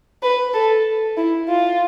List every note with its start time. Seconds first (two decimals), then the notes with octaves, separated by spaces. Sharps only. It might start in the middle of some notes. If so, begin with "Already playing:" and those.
0.23 B4
0.54 A4
1.17 E4
1.48 F4